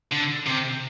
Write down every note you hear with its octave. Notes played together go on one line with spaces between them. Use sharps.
D3
C3